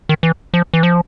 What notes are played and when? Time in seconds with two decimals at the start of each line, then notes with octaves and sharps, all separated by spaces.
0.09 D#3
0.23 E3
0.54 F3
0.74 E3
0.83 F3